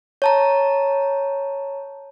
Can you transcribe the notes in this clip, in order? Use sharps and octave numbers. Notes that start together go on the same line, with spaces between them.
C#5 A5 A#5